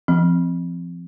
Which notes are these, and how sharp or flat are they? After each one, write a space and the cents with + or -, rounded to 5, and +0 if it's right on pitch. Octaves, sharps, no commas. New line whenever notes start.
F3 -30 C4 -10